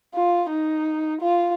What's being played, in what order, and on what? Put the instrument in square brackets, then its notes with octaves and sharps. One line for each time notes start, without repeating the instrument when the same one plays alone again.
[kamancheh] F4
D#4
F4